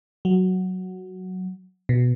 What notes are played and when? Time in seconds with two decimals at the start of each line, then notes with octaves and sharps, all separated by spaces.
0.25 F#3
1.89 B2